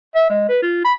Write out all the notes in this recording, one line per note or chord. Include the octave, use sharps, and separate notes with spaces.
E5
G#3
B4
F4
B5